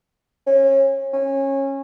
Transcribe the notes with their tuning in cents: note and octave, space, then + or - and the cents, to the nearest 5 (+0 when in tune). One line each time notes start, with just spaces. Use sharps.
C#4 -30
C#4 -20